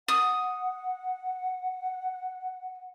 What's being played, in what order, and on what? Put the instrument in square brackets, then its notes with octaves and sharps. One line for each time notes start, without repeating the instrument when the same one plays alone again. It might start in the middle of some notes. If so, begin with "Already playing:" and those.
[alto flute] F#5 [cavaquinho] D#6